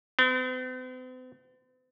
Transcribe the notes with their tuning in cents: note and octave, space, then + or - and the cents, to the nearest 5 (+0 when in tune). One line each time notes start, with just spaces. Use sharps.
C4 -45